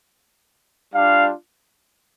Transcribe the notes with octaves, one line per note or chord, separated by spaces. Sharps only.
G3 D4 F4 F5